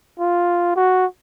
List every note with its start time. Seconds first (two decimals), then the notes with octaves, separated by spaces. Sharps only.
0.20 F4
0.76 F#4